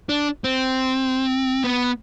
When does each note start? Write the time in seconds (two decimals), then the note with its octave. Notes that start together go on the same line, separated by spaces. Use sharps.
0.09 D4
0.44 C4
1.64 B3